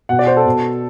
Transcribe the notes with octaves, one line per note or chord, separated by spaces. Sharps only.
B2 F#5
D5
C5
A4
B2